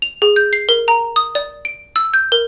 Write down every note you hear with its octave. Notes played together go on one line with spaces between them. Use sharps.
F7
G#4
G6
C7
A#4
A#5
D#6
D5
D7
E6
G6
A#4